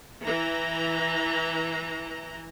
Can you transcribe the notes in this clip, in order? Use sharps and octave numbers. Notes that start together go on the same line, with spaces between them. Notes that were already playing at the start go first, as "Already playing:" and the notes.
E3 A#5